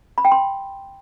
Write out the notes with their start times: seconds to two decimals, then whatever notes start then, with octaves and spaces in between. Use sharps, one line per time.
0.18 B5
0.25 G5
0.32 C6